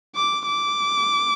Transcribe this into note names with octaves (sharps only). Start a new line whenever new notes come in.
D6
D6